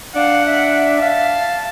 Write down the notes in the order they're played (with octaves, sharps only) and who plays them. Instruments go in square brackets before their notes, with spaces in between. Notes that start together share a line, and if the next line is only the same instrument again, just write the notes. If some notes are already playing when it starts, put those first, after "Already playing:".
[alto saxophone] D4 [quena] F5 [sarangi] F#5
[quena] E5
[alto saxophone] F5 [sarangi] A5